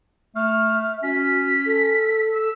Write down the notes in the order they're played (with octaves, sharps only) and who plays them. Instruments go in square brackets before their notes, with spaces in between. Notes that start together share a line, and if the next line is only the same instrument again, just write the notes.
[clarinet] A3 [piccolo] F6
[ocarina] E5
[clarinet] C#4 [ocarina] F#4 [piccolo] B6
[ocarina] A4
[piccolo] E6